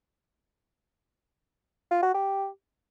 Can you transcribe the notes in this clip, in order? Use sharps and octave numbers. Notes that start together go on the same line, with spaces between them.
F4
F#4
G4